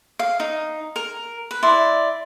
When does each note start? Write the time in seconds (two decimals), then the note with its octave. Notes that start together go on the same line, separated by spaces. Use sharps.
0.19 F5
0.40 D#4
0.96 A#4
1.51 B4
1.63 E4 D5 C6